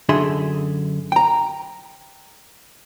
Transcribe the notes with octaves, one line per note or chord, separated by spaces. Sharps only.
F#2 D3 G#4 E5 C6
G5 A#5